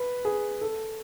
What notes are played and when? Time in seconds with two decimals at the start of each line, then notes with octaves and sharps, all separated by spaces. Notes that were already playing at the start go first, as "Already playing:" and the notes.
Already playing: B4
0.25 G#4
0.61 A4